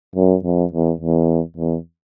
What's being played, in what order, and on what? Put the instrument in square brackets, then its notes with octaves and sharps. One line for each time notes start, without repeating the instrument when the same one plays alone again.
[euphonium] F#2
F2
E2
E2
E2